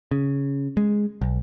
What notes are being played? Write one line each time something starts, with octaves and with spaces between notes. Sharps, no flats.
C#3
G#3
B1